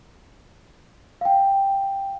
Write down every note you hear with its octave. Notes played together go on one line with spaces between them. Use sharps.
F5 G5